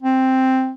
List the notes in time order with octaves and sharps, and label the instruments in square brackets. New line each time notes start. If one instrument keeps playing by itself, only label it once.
[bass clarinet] C4